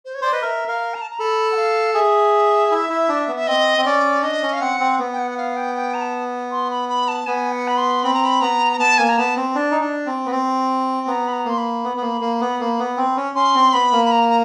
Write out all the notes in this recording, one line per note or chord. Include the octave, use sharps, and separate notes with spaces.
C5
C#5
C5 D5
B4 D#5
A#4 E5
A#4 F5
A#5
A5
A#5
A4 B5
F#5
F5
G#4 E5
E4
E4
D4
B3
E5
C4 D#5
C4
C#4 D5
D4 D#5
C#4
F5
C4 F#5
C4
B3
G5
F#5
F#5
F5
G5
G5
A#5
A5
C6
B5
B5
A5
B3 G#5
F#5
B5
C6
C4 B5
A#5
B5
B3 A#5
A#5
B3 A5
A#3 G#5
A#5
B3 A5
C4
D4
D#4
D4
C4
B3
C4
B3 A#5
B5
A#5
A#3 C6
B5
B3
B3
A#3
A#3
B3
A#3
B3
C4
C#4
C#4 C6
C4
B3 B5
A#3
B5
A#5
A#5